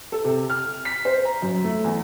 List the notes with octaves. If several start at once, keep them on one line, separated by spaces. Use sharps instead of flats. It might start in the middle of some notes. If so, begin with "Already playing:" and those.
A4
C3
F6
B6
C5
A#5
F#2
A3
E2